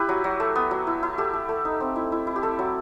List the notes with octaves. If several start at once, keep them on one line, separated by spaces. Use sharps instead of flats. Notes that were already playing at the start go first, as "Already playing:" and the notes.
Already playing: E4 G4 B4
F#3
F#3
A3
B3
F#3
E4
E4
A3 G4
A3
A3
D#4
C4
E4
E4
E4
G4
A3 A4
F#3